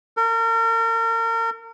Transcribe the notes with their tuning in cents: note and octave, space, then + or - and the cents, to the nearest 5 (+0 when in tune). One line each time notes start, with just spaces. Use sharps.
A#4 -35